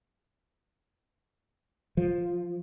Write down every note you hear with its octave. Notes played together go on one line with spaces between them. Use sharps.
F3